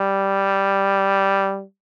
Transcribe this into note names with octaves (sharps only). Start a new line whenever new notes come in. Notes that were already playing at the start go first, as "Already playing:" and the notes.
Already playing: G3